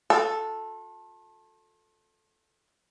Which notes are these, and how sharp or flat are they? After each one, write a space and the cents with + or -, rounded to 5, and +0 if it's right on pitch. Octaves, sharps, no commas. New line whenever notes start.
F4 +45 A4 +0